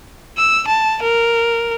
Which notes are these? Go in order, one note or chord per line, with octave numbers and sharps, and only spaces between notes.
E6
A5
A#4